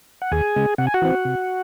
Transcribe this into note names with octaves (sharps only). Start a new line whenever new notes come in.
F#5
D#2 G#4 G#5
C#3 G#3
C3 F#5
G#5
F#4 F#5
E3 C4
C3